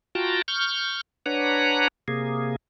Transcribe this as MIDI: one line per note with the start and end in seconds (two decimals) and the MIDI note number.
0.15 0.42 65
0.15 0.42 66
0.15 0.42 79
0.15 0.42 81
0.15 0.42 82
0.48 1.01 85
0.48 1.01 89
0.48 1.01 91
1.26 1.88 62
1.26 1.88 71
1.26 1.88 73
1.26 1.88 78
1.26 1.88 82
2.08 2.56 48
2.08 2.56 58
2.08 2.56 68